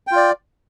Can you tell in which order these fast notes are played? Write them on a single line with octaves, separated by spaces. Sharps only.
G5 F4 D5